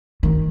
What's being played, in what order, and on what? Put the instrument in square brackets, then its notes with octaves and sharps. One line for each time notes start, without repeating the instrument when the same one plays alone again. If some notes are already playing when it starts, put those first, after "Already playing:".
[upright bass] D#3